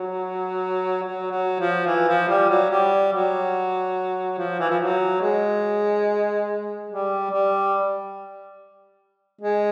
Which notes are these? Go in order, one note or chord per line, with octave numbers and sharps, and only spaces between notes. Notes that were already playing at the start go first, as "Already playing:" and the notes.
Already playing: F#3
F#3
F#3
F3
E3
F3
G3
F#3
G3
F#3
F3
E3
F3
F#3
G#3
G3
G3
G#3